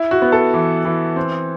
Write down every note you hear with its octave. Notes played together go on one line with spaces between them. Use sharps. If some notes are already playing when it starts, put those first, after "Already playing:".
Already playing: E4
F#4
B3
A4
E3
E3
C4